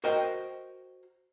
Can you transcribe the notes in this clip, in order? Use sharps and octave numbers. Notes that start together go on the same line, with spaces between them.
F#4 A#4 C5 D#5 G5